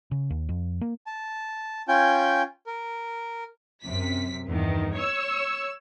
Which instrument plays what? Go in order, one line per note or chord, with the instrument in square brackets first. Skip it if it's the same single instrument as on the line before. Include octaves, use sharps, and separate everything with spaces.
[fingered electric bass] C#3
D#2
F2
A#3
[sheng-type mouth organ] A5
C#4 F4 G5 G#5 G6
A#4
[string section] F#2 C3 B6
E2 G2 D#3
C#5 C#6 E6